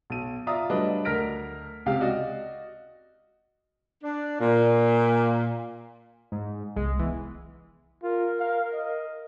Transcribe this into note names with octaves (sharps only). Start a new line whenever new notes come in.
B1 D#7
F4 D5 E5 F5 A#5 D#6
F#3 G3 A3 D4 B4 D#5
D2 A#4 F6 A#6 B6 D7
C#2 C3 G4 F5
F#4 D5 D#5
D4
A#2
G#2
C2 G#3
E3 B3
F4 A#4
F5
D#5